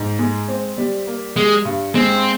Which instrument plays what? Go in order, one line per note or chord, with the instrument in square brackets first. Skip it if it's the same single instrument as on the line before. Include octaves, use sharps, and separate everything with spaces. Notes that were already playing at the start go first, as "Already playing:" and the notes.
Already playing: [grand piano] G#2
G#3
C4
G3
A#3
[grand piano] G3 [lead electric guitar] G#3
[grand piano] G2
[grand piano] G#3 [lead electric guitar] C4